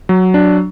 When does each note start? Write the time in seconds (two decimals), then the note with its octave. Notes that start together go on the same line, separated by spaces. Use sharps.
0.09 F#3
0.34 D4